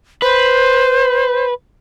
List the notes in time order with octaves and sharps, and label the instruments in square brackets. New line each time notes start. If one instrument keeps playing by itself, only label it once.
[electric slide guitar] B4 [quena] C5